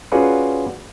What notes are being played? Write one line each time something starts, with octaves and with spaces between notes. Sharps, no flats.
C#4 F4 F#4 G#4 B4 D5